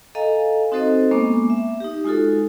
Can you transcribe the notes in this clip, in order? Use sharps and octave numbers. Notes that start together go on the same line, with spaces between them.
A4 D#5 F5 G#5 A#5
C4 D#4 F#4 A4 C5 D#5
G#3 A#3 B3 C#4 D6
E5
D#4 G4
G#3 D#4 F4 F#4 A4